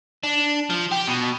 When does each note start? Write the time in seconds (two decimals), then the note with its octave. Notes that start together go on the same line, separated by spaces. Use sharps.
0.23 D4
0.70 F3
0.92 G4
1.08 B2